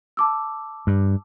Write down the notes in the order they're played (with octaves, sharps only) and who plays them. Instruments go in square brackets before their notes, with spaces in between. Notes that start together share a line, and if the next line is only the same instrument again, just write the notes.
[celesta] A5 D6 E6
[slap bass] G2